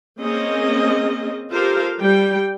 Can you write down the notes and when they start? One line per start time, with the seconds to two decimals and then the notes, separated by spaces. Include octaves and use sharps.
0.20 A#3 C4 C#4 G#4 D#5
1.52 F4 G4 A4 A#4 C5 F5
2.01 G3 G5